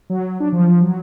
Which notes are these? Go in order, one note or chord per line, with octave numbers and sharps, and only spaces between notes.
F#3
D4
F3
F#3